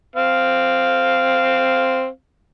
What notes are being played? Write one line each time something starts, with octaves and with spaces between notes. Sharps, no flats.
C4 F5